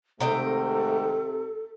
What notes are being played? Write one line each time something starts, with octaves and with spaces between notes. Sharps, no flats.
G#2 C3 D#3 A3 A4 D#5 G5